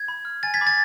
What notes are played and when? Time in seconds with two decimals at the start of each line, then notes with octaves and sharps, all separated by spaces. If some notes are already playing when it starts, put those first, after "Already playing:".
Already playing: G#6
0.08 B5
0.25 F6
0.43 G#5 A6
0.54 G#6 B6
0.60 B5 D6 F6
0.67 A6